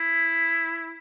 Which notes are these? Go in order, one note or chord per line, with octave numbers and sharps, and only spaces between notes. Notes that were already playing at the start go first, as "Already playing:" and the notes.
Already playing: E4